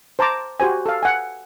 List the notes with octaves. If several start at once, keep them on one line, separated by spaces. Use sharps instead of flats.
C5 A5 A#5 D6
F#4 G4 C5 G#5
A4 F5
F#5 G#5